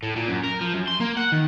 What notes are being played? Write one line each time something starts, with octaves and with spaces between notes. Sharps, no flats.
A2
A#2
F#2
A#4
F3
F#2
C6
A#3
F#5
D#3